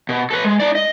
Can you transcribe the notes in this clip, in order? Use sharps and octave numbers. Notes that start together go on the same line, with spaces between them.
B2
A4 B4
G#3
D#4 D5
D#5